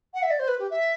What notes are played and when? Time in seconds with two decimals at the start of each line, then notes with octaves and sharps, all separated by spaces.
0.14 F#5
0.23 E5
0.30 D5
0.39 C5
0.48 B4
0.59 G4
0.71 E5